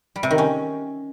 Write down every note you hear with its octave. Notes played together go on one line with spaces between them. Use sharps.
G3
C3
D#3
C#4